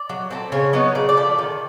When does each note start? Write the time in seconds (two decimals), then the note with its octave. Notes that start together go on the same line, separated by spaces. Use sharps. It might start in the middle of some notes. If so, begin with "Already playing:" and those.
Already playing: D5
0.09 F#3
0.31 A3 C4
0.52 C#3 C#5
0.73 F#3 B3 D#4 C#5
0.95 C#3 D5
1.09 D5
1.17 F3 A3
1.38 D#3